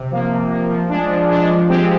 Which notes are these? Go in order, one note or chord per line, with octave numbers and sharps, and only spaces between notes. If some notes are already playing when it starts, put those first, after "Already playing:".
Already playing: C3
F3 A#3
C3
F3 A#3
F3
G#3 D4
F3
G#3 D4
F3
G#3 C4 G4